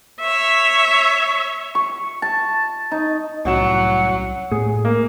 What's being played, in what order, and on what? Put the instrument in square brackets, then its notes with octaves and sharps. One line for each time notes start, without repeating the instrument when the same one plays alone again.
[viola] C#5 E5
[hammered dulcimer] C#6
A5
D#4
[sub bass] C2 [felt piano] A2 C#4 E7 [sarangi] F#3 [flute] F#5
[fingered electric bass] A2 [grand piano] G#4
[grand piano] A#3